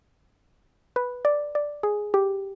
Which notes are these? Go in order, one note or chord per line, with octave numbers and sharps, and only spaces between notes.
B4
D5
D5
G#4
G4